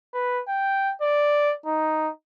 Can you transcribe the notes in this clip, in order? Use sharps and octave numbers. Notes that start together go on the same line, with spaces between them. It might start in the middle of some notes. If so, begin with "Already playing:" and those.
B4
G5
D5
D#4